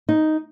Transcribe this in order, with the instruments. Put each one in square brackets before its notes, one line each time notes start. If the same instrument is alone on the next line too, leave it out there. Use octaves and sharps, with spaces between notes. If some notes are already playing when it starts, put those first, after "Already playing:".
[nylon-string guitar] D#4